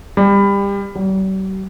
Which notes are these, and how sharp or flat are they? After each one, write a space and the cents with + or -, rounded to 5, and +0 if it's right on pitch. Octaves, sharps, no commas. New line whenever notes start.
G3 +25
G3 -45